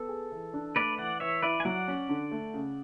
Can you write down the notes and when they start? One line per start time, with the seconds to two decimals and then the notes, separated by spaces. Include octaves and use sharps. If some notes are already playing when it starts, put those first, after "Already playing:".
Already playing: B3 A4
0.09 G#4
0.32 E3
0.54 D4
0.76 A3 B4 D5
0.98 E3 D5 F#5
1.20 E3 C#5 E5
1.42 E4 B4 D5
1.60 G#5
1.65 F#3 D5 F#5
1.88 C#4
2.09 D3
2.31 A3
2.54 C#3